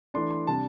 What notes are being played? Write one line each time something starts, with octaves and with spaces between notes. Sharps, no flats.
E3 A3 D4 C6
C6
C3 G3 D4 A5